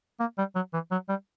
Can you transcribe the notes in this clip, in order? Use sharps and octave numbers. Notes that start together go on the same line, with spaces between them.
A#3
G3
F#3
E3
F#3
G3